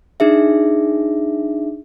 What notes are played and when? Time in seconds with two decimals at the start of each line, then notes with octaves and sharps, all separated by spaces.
0.20 D4 D#4 G#4 E5